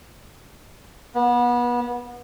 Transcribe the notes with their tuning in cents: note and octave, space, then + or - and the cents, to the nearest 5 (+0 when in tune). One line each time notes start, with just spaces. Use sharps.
B3 -30